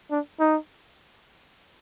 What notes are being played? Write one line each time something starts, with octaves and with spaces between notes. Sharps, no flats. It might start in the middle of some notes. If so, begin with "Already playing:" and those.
D4
D#4